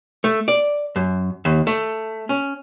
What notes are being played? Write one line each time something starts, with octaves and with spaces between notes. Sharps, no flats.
A3
D5
F#2
D#2
A3
C#4